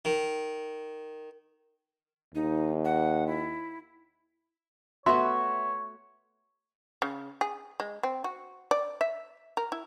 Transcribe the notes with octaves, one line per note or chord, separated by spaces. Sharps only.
D#3
D#2 D#4
F#5
E4
A3 B3 F#4 C#5 E5 C6
C#3
G#4
G#3
C4
F#4
D5
E5
A#4
E4